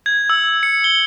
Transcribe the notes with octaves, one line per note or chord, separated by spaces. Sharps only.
G#6
E6
C#7
G7